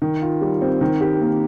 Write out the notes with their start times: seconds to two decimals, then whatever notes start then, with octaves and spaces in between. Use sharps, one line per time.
0.02 D#3
0.22 F4
0.41 G3
0.61 C4
0.81 D#3
1.01 G4
1.21 A#3